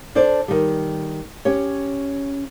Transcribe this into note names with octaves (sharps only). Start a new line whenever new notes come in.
D4 A4 C5 D5
D#3 G3
C#4 G4 C#5